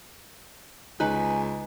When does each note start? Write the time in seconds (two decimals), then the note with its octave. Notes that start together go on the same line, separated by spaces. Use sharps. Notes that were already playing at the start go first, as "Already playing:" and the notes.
1.00 C#2 D#4 B4 G#5